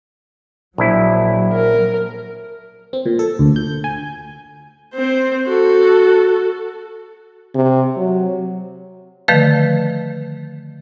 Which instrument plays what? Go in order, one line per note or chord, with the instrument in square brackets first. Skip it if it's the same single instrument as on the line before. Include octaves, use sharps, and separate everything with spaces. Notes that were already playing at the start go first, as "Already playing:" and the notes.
[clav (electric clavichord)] A#1 E4 [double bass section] F#3
[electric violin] A#4
[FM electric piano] C4
A#2
A4
D2
G6
G#5
[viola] C4 C5
F#4 A4
[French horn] C3
F#3
[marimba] D3 D#3 F3 A3 B4